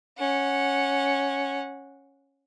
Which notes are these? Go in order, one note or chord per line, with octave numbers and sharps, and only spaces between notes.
C#4 F#5